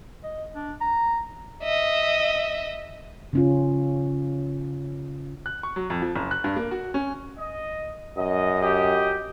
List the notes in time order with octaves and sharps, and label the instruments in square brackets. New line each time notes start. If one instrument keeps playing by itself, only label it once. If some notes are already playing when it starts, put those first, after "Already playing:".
[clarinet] D#5
D4
A#5
[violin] D#5 E5
[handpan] C#3 C#4 F4
[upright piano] F#6
C#6
F#3
F2
F3
F#1
F#6
G2
A#3
F#4
C#4
[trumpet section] D#5
[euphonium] F#2 [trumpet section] D#5
[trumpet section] G4 [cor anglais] D#5